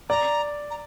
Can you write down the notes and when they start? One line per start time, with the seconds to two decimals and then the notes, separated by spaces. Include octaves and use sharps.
0.09 D5 A#5
0.70 A#5